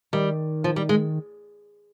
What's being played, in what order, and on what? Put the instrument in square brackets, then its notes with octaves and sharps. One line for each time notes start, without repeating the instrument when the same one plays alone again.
[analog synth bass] D#3 [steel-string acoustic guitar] G3
[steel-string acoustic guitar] F3
G3
G#3